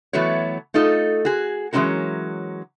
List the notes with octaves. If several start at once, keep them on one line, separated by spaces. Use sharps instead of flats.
E3 F#3 A3 B3 F#4 C#5
A3 D#4 F4 A4 D#5
F#4 G#4
E3 F#3 G#3 C#4 F#4 A#4